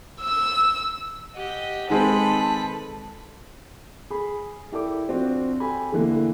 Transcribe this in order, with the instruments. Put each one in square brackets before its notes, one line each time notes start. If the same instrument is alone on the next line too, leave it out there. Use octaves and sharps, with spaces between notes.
[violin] E6
[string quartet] G4 D#5 F#5
[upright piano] D#3 G#3 C4 [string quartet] A4 B4 B5 [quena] A5
[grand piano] G#4 B5
E4 G4 A4 A#4 D5 D6
F3 C4 D4 F4 F#4
G4 A4 G#5 B5
D3 E3 A3 A#3